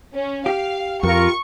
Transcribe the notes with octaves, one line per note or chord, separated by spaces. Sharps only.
C#4
G4 F5
F2 F4 A#4 C#6